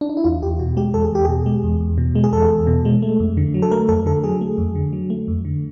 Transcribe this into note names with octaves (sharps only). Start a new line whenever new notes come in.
D4
D#4
E4
E2 F4
E2 G4
B2 F#4
G#3 G4
E2 A4
G#4
E2 G4
B2 G#4
G#3
E2
E2
B2
G#3
G#4
E2 A4
E2
B2
G#3
A3
F2
D3
F#3
A4
A3 A#4
F2 A4
D3 A4
F#3 G#4
A3
F2
D3
F#3
A3
F2
D3